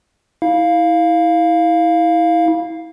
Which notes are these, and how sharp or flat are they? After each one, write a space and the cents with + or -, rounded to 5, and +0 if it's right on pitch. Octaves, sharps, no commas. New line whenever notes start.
E4 -30 F5 +0